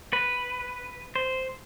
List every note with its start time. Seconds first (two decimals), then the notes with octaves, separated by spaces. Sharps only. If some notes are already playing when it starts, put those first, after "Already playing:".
0.13 B4
1.16 C5